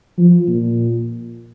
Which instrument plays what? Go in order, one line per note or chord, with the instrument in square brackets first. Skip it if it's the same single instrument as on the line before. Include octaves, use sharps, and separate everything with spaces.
[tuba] F3
A#2